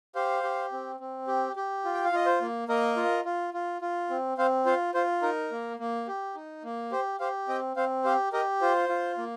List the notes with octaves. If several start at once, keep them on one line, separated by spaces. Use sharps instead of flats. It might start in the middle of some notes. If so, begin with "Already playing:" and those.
G4 C5 F5
G4
C4
C4
G4
G4
F4
G5
F5
F4 D#5
C5
A#3
A#3 A#4 D#5
F4
F4
F4
F4
C4
C4 C5 F5
F4 C5 F5
F4 C5
D#4 A#4
A#3
A#3
G4
D#4
A#3
G4 C5
G4 C5 F5
C4 D#5 G5
C4 C5 F5
G4 C5 F5
G4 A#4 D#5
F4 C5
F4
A#3